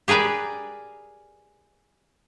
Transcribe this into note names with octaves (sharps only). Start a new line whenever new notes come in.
G4 G#4 A#4 B4 D5